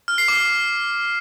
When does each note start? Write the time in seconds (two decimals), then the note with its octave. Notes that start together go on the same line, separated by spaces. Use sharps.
0.08 F6
0.18 C7
0.28 D6